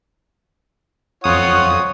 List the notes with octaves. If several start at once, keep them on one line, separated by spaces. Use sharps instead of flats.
F2 F4 C#5 F#5 D#6